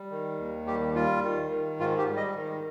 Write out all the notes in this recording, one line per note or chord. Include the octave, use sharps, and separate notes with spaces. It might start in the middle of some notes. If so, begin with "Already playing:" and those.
Already playing: G3
D#3
D#2
G3 G4
G3 F4
D#3
D#3
G#2 F4
G4
G3
D#5
D#3